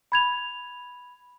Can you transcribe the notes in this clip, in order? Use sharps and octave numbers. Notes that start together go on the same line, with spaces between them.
B5 G#6 F7